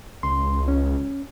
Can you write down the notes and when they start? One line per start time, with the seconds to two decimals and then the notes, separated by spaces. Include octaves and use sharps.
0.23 C#2 C6
0.68 C#4